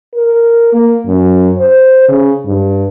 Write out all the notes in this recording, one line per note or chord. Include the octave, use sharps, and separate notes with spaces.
A#4
A#3
F#2
C5
C#3
G2